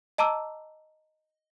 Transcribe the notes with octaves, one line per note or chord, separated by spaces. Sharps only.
D#5 A5 A#5 D6 E6